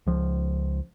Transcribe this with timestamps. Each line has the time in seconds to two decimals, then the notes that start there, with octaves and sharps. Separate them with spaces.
0.06 C#2 F3